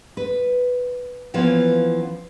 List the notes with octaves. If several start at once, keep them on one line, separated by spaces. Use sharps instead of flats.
B4
E3 F3 A#3 B3 C#4 E4